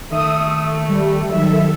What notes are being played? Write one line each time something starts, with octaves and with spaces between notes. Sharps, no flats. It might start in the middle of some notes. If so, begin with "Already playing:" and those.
D#3 A3 E5 D#6 E6
G3
D#3 F#3 A4 E5